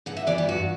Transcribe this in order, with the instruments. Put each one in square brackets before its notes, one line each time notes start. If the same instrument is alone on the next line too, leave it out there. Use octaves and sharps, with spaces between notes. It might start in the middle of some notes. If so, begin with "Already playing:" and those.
[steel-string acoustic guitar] G2 F#5
E5
E3 G3 B3 D5
G4
G2 F#4